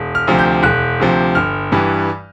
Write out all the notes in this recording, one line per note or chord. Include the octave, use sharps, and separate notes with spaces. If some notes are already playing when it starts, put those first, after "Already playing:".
Already playing: E1
F6
D2 C3 F3
G6
E1 F#6
D2 C3 F3
G1 F6
G2 E3 G3